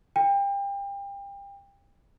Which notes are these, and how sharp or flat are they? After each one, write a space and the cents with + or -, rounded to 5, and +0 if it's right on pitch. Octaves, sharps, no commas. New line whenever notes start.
G5 +30